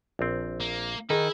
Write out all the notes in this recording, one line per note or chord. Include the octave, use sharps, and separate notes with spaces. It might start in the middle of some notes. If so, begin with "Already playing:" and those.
A#1 C4
A#3
D#3 D#4 E4 G#4